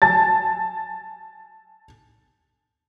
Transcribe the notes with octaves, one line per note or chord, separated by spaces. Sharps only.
G#5 A5 A6